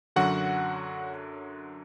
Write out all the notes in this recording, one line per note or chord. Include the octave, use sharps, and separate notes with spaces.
F#2 D3 F#3 F#4 F#5